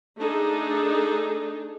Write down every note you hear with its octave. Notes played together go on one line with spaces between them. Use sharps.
A3 D4 D#4 G#4 A4